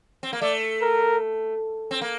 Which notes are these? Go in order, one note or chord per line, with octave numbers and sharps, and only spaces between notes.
C4
A#3
A3 D5
A#4
C4
A#3